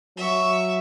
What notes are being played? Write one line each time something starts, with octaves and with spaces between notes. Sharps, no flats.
F#3 E5 C#6